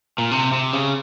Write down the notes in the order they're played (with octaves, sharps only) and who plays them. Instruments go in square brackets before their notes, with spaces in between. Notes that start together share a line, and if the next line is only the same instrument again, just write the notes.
[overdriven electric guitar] A#2
C3
C3
C#3